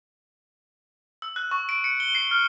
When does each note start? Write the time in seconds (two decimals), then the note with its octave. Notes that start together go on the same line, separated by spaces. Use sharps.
1.22 E6
1.36 F#6
1.51 C#6
1.69 D7
1.84 C#7
2.00 G7
2.15 C7
2.31 F6